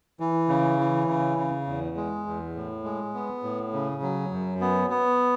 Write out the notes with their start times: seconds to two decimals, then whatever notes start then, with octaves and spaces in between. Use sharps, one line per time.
0.20 E3
0.49 C#3
0.79 E3
1.07 C#3
1.38 C#3
1.67 E2
1.96 G#3
2.26 E2
2.56 A2
2.84 G#3
3.14 B3
3.43 A2
3.73 C#3
4.02 F#3
4.31 F#2
4.61 B3
4.90 B3